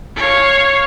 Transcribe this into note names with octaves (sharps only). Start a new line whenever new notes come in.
C#5 F5